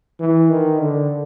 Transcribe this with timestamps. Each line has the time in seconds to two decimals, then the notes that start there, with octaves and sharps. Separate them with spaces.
0.20 E3
0.50 D#3
0.80 D3